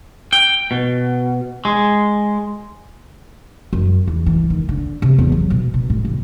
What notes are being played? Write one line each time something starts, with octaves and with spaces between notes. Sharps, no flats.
G5
B2
G#3
F#2
E2
E3
D#3
D3
C3
E2
F#3
B2
B2
A2
F1